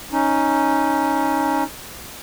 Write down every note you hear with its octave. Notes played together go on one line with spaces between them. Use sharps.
C#4 D#4